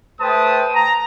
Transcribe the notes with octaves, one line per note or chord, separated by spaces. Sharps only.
A3 B4 C5 G5 A5 D#6
A#5